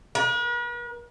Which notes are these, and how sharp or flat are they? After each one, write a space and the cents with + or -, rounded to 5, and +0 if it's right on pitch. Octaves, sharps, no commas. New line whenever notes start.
B4 -45